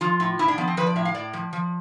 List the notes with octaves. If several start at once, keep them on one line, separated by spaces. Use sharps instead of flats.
F3 F4
A2
A2 E4
D4
F3 B3
C4
F3 B4
D5
A2 E5
F5
A2 D5
F3
F3